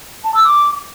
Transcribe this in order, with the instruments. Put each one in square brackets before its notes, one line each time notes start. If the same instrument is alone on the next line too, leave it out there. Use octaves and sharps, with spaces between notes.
[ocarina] A5
E6
D6